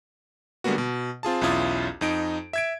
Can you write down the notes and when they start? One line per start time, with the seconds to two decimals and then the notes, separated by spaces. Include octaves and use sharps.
0.64 D3 G3 G#3 A#3 B3 F#4
0.78 B2
1.23 C4 F4 G#4 A5
1.41 B1 E2 C#4 E4 F4 D#6
2.01 F2 D#4 D7
2.53 E5 G#6 D7